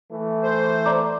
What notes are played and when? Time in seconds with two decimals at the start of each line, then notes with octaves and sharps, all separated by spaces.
0.11 E3 A3
0.43 C5
0.86 D5 A#5 D6